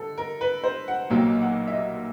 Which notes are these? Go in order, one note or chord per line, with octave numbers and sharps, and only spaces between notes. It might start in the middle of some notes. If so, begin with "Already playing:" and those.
Already playing: D3 A4
A#4
B4
C5
F#5
B1 A#2 F#3 A#3 G5
F#5
E5
D#5